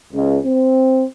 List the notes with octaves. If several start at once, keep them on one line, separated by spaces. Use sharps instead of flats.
C#2
C4